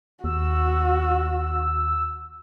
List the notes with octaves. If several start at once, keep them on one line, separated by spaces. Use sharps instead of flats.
D#2 F#4 E6